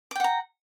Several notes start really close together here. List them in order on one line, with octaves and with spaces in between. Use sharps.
D6 G5 F#5 A#5